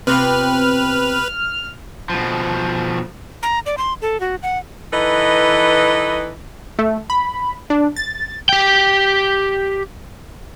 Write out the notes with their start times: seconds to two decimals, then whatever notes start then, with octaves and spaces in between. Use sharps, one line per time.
0.07 C3 B3 C4 F4 B4 F6
2.10 B2 F3
3.43 A#5
3.66 D5
3.78 C6
4.02 A4
4.20 F#4
4.43 F#5
4.93 E3 D#4 A4 B4 D#5
6.79 A3
7.10 B5
7.70 D4
7.96 A6
8.49 G4 G5